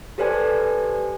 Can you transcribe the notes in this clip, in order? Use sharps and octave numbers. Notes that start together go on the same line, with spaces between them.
G4 A4 B4 C5 D5 G#5